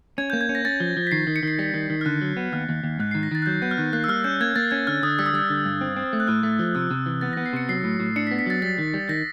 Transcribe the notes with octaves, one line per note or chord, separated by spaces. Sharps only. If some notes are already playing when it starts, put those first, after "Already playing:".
C#4 G#6
A#3 G6
G#6
C#4
A#6
C#4 A6
F3
F3
B6
D#3 C7
D#3
C#7
D#3 C7
G3 B6
D#3
D#3
F6
D3 F#6
F#3
B3
D#2 F6
D#2
D#2
G#2 F#6
D#3 C7
A#6
D#3 A6
F#6
F#3 G6
B3 G6
F6
D#3 F#6
A#3 F#6
E6
G3 F6
C#4 G6
A#3 G#6
A#3 A6
C#4 G#6
D3 F6
D3 D#6
G3 E6
D#6
G3 E6
D3
G2
C4
C4
A3
F#6
A2 F6
A3
F3
C3 E6
C3
E3
B3 A6
B3 A#6
C7
C3 C#7
F#3 C7
A2
A2
D4 C#7
B6
B3
B6
F#3 A6
G3 A6
D#3
G3
D#3 A#6